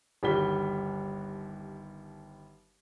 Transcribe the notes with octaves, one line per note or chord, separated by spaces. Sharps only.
G1 D#2 G3 F#4 B6 G7